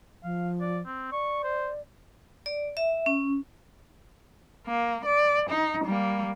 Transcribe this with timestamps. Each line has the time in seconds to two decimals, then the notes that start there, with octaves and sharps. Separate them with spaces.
0.24 F3 F5
0.61 D5
0.86 C4
1.12 D5 C#6
1.44 C5
2.46 D5
2.77 E5
3.06 C#4
4.67 A#3
5.06 D5
5.50 D#4
5.85 G3 A#3